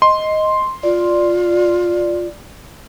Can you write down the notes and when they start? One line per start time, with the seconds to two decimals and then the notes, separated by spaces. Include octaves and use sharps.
0.02 D#5 C6
0.83 F4 D5